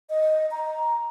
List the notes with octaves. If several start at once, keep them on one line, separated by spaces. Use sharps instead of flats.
D#5
A#5